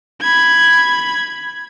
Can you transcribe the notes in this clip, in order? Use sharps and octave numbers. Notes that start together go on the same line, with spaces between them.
B5 G#6